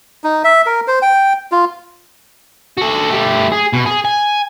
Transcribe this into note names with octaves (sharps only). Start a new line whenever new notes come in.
D#4
E5
A#4
C5
G5
F4
F#4 A4
A3 G4
G#4
B2
G#4
G#5